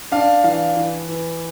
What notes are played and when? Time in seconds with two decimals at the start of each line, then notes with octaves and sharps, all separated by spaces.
0.12 D4 F5
0.44 E3 F5
0.76 E3
1.08 E3